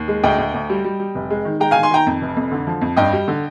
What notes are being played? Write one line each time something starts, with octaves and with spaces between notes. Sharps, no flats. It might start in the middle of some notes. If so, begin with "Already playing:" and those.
Already playing: D#2
G#3
D2 D#5 G5
D2
D2
G3
G3
G3
F1
G#3
D#3
G#3 G5 A#5
D#3 F5 G#5
G#5 C6
D#3 G5 A#5
F2
F1
F2
D3
F3
F2
G2 D#5 G5
G3
D3